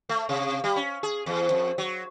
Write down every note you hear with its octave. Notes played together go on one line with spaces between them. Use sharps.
A3
C3
G3
C#4
G#4
E2
F2
F#3